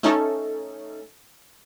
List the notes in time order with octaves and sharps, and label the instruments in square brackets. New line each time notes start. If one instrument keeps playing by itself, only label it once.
[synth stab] A3 C#4 D#4 A4